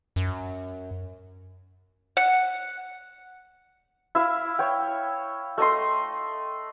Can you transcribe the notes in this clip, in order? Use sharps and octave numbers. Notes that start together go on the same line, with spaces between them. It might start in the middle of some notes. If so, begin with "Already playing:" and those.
F#2
F#5
E4 E5 F5
C#5 G5
A3 D#5 C6